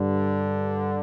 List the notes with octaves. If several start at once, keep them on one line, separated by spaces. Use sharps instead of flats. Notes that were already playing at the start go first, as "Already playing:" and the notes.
Already playing: G2 D3